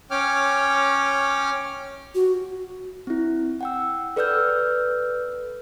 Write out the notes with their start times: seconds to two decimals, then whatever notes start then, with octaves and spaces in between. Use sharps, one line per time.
0.11 C#4 C#5 G5 D6 F6
2.15 F#4
3.07 C4 E4
3.61 F#5 G5 E6
4.16 A4 B4 D5 E6 F6 G6